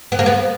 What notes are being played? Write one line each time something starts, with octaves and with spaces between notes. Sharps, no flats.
B3
A#3
B3